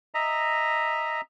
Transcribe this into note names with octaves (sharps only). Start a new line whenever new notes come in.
D#5 E5 A#5